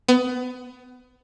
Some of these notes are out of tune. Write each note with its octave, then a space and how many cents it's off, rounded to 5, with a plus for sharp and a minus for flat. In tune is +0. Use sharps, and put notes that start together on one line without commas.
B3 +25